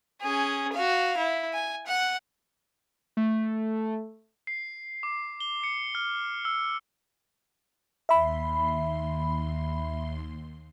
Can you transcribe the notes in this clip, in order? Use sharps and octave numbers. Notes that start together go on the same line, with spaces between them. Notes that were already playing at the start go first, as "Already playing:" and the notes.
C#4 G#4
F#4 F5
E4
G#5
F#5
A3
C7
D6
G7
C#7
F6
E6
D#2 E5 B5 C6